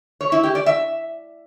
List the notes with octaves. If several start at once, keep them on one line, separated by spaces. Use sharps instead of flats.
C#5
E4
G4
D5
E5